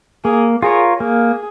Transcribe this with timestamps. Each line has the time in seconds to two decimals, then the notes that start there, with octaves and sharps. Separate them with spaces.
0.25 A#3 G#4
0.62 F4 G#4 A#4 C#5
1.00 A#3 G#4